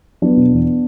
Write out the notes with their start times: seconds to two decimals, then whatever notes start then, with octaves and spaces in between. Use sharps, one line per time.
0.22 F#3 B3 D4
0.37 B2
0.52 E2